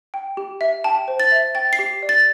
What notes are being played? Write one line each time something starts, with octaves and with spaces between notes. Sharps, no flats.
G5
G4
E5
G5 A5
C5
A6
E5
G5 A6
C7
G4
D5
A6